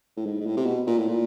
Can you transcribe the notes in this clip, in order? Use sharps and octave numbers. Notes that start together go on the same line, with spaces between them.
A2
G#2
G#2
A2
C3
B2
A#2
A2
A#2